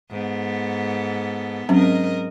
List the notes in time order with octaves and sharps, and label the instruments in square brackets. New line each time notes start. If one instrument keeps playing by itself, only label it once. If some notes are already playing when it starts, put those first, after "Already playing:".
[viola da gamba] G#2 B3 A4
[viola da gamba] G#2 A#4 D#5 [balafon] F#3 C4 C#4